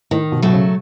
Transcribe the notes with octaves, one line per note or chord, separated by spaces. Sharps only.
A2 D#3
B2
B2 F#3 A3
C#3